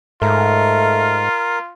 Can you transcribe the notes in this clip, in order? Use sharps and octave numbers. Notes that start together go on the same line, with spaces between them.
G#2 A3 F4 A#4